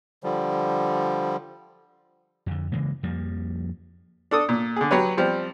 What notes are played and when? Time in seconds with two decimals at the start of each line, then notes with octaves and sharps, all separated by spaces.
0.23 D3 F3 G3
2.46 F2 D3
2.72 C#3 E3 G#3 A#3
3.03 F2 F3 G3 A#3
4.31 D4 A4 D#6
4.49 A#2
4.76 D3 G#4
4.91 F#3 G4 B4 C#5
5.17 F3 G3 C4